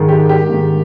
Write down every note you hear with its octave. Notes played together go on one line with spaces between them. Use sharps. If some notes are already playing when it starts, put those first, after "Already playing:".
Already playing: G#2 D#3 G#3
G4
G4
G#2 D#3 G#3